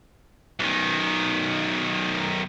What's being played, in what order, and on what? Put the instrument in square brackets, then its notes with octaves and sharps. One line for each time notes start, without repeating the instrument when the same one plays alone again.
[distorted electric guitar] B1 D#3